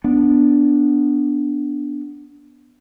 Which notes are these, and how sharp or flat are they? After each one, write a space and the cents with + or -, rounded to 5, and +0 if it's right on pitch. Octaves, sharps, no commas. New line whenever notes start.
B3 +0 D4 -10